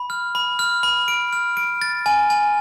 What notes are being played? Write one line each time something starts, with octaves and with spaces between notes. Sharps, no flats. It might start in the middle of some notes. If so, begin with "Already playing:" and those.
Already playing: B5
F6
B5
F6
B5
D7
F6
D7
A6
G#5
G#5